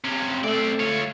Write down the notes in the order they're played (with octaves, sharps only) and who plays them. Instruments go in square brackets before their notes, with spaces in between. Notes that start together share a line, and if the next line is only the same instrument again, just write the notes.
[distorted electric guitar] C3 C#4
[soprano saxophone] A3 [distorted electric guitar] C4 D5
[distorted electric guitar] F4 C#5